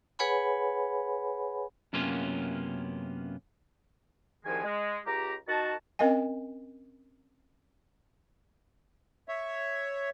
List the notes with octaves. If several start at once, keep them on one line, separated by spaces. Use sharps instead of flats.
G#4 B4 C#5 F#5 G#5 B5
F#2 C3 A#3 B3 C#4 F4
C2 G#2 D#3 F3 G#3 G#5
G#3
C#2 G4 A#5
D#3 F#4 A5
C4 C#4 A#4 D#5 F5 G#5
C#5 E5